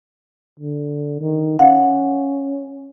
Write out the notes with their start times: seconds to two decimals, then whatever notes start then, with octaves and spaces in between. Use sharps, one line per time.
0.59 D3
1.21 D#3
1.59 C#4 F5 F#5